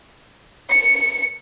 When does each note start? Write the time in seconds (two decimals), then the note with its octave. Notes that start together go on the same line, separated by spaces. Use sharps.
0.70 C#7